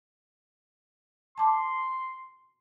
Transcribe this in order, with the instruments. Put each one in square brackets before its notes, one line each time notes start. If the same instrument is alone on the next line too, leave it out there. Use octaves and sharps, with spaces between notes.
[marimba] A5 D6 [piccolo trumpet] C6